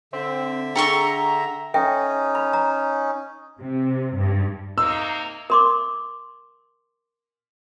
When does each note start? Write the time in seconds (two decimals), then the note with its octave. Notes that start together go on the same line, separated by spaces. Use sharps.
0.13 D3 C4 E5
0.76 D4 G#4 A4 G5 A#5 C6 C#6
1.74 C#4 D#4 A4 E5 G5
2.35 B5
2.53 A#5
3.60 C3
4.16 G2
4.78 C3 A#3 D#4 E6
5.50 A#4 C6 D6